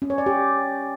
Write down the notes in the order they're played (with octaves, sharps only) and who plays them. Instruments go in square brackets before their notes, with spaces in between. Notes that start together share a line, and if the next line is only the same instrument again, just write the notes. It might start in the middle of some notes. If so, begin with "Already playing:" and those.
[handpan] C#4
C#5
D5
G4